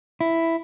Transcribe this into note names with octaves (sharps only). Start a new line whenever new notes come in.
E4